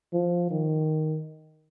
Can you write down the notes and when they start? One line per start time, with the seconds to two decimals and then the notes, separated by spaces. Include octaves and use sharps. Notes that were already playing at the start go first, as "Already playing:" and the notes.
0.13 F3
0.50 D#3